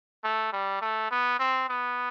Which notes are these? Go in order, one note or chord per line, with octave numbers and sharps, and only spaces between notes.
A3
G3
A3
B3
C4
B3